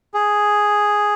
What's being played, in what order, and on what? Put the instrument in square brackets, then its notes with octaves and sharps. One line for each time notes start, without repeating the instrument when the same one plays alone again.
[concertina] G#4